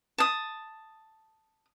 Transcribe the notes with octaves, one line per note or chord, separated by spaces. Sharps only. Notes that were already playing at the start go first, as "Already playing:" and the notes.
A5 D#6